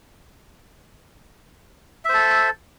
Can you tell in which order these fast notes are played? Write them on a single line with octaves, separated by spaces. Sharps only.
E5 C5 A4